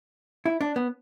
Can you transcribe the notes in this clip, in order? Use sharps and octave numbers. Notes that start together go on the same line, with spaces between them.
E4
D4
B3